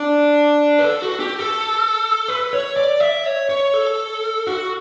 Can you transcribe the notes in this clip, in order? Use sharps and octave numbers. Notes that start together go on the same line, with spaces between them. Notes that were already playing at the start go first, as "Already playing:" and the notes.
Already playing: D4
B4
A4
F#4
G4
A4
B4
C#5
D5
E5
C#5
C#5
A4
F#4